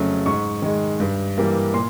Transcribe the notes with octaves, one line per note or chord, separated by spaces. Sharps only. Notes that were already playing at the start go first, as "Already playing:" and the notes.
Already playing: F2 C#3 F#3 A3
G#2 C#6
D#3 G#3
G2
E3 G3 A#3
A#2 C6